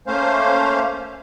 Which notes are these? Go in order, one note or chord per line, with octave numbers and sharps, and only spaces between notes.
A3 A#3 C#4 C5 F5